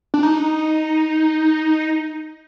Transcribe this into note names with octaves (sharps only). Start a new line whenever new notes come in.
D4
D#4